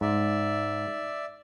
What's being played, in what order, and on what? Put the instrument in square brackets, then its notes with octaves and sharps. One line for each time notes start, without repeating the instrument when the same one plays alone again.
[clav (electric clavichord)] G#2 [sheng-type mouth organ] D5 E5